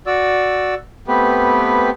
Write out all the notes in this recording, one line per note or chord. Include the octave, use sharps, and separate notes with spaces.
F#4 D5 E6
A3 B3 C4 G4 B4